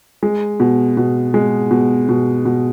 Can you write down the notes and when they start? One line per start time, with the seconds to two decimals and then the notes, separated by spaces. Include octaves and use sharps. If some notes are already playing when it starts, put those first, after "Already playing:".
0.23 G#3
0.60 B2
0.97 B2
1.34 G#3
1.71 B2
2.09 B2
2.45 B2